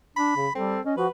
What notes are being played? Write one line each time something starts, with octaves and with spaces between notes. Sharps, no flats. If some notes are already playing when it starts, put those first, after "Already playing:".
D4 B5
C#3
G3 C4 A4
C#4 D#5
F3 F#4 B4